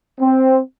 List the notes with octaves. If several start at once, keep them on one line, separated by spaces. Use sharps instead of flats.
C4